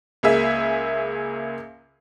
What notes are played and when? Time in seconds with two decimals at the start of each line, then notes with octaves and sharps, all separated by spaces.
0.23 C#2 A#3 G#4 E5